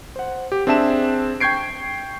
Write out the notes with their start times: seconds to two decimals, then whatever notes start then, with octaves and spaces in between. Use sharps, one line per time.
0.16 C5 F#5
0.52 G4
0.67 C4 D4 G#4 E5 A5 E7
1.41 G5 C#6 G6 G#6 C7 D7